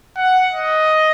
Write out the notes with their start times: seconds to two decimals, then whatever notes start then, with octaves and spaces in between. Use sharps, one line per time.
0.17 F#5
0.52 D#5